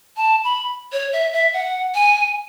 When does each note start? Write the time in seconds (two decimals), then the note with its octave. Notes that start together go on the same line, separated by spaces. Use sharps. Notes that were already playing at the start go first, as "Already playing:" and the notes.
0.17 A5
0.44 B5
0.92 C#5
1.13 E5
1.33 E5
1.53 F#5
1.95 G#5